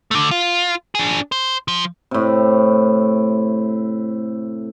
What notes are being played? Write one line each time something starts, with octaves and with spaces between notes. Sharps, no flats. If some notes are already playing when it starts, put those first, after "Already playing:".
D3 A3
F4
D4 G#4
C5
F3
A2 C3